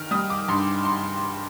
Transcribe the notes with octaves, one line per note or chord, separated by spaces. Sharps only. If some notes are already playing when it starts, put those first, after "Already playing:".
Already playing: D#3 F6
G3 D#6
D6
G2 C6
C6